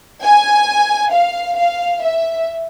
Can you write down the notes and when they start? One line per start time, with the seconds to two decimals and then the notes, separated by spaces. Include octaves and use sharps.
0.23 G#5
1.12 F5
1.57 F5
2.03 E5